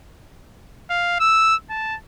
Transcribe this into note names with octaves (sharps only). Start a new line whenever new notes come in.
F5
E6
A5